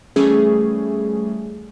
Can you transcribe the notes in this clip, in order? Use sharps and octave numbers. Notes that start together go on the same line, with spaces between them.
E3 G3 A3 C#4 G#4